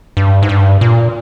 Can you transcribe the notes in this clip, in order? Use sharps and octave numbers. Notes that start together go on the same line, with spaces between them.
G2
G#2
G2
A#2